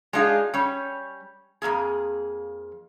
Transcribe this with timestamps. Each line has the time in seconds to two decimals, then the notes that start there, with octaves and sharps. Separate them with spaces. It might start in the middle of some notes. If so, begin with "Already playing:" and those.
0.13 G#3 D4 D#4 F4 F#4 G#4
0.54 G3 C#4 C#5
1.62 F2 D#3 A#3 G#4